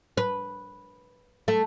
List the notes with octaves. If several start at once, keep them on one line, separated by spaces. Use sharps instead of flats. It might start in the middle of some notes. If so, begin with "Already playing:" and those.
B4
A3